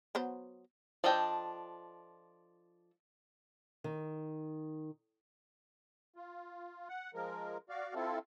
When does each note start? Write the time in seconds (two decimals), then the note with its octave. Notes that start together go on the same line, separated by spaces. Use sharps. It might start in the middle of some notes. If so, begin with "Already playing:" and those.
0.15 F#3 B3 C5
1.04 F3 D4 A4 D#5 G5
3.84 D#3
6.16 F4
6.89 F#5
7.14 F3 G#3 A#4
7.69 F#4 D5 F5
7.95 C4 E4 F4 A4